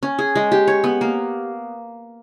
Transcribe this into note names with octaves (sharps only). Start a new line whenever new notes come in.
C#4
G#4
G#3
G4
C#5
B3
A#3